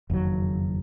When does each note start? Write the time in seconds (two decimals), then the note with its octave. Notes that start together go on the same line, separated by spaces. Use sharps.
0.10 F#1 F2 D#3 F#3